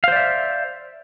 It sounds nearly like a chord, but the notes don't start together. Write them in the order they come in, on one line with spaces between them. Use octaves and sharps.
F5 C5 D5 E5